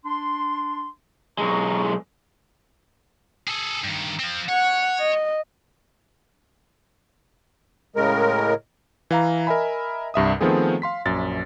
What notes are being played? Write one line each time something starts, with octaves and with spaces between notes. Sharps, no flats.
D4 C6
B1 G#3 A#5 C#6
G#4 A4
G2 D#3
F3 C4
C#5 F#5
D#5
A2 C#3 G#3 A#4
E3 F5 A#5
A#4 D#5 E5 G#5 B5
C2 G2 E5 D#6
D#3 F3 A3 B3 C4 G#4
F5 C6 B6
A#1 F#2 A6